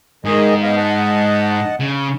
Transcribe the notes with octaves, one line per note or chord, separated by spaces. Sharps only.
G#2 D#3 G#4 D#5
B3 D#5 F5
D#5 F#5 A5
C#3